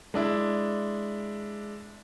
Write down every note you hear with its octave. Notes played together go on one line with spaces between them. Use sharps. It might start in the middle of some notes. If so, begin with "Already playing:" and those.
G#3 D4 E4